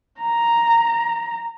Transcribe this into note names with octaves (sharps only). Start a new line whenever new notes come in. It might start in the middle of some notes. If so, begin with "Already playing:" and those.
A#5